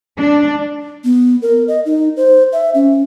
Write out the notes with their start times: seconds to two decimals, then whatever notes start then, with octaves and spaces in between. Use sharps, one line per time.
0.18 D4
1.04 B3
1.42 A#4
1.68 D#5
1.85 D#4
2.17 C5
2.52 E5
2.75 C#4